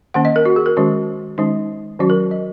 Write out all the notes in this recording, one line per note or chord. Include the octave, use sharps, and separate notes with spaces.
D#3 A#3 C#4 F#5
D#5
A#4
F#4
G#4
A#4
D#3 G#3 C#4 F#4
D#3 G#3 C#4 D#4
D#3 F#3 C#4 F#4
A#4
D#5